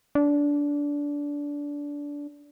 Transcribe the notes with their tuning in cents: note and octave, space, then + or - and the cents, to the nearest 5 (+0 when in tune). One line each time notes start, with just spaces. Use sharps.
D4 -20